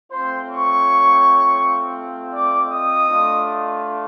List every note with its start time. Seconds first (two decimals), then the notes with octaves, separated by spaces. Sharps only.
0.11 A3 C4 F4 C5 C6
0.48 C#5 C#6
2.32 D5 D6
2.69 D#5 D#6
3.07 A3 D4 F4